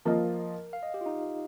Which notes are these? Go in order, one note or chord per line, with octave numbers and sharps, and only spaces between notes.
F3 A#3 F4 A#4 D#5
F5
D#5
G4
F4
D#4